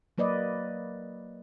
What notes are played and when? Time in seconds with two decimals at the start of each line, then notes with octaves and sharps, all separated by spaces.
0.18 F#3 A#3 B4 D5 D#5